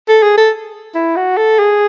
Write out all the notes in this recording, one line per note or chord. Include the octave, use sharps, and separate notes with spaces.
A4
G#4
A4
E4
F#4
A4
G#4